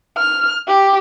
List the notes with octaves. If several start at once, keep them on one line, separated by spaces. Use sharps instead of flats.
F6
G4